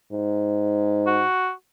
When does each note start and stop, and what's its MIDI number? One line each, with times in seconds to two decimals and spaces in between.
0.12 1.23 44
1.06 1.51 66